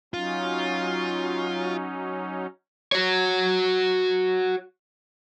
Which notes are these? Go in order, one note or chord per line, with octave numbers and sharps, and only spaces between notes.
F#3 C#4 D#4 F4
F#4 C#5